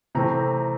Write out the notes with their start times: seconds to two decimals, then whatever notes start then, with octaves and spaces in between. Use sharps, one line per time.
0.15 C3 E3 A3 C4 A#5